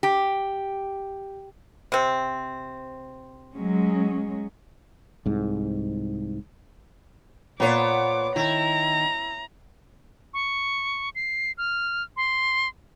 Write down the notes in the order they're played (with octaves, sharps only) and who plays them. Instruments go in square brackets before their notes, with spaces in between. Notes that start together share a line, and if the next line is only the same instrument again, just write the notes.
[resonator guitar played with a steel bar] G4
[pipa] C3 C4
[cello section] F#3 G#3 C#4
[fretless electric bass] C2 G#2
[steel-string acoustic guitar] A#2 C5 [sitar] B3 C#5 [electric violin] D6
[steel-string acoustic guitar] D#3 [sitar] E4 [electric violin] A#5
[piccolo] C#6
C7
F6
C6